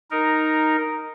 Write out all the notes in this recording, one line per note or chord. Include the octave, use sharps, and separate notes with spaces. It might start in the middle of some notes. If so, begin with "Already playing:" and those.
D#4 A#4